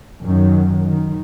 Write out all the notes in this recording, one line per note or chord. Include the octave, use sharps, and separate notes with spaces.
F#2 D#3 F#3
D#3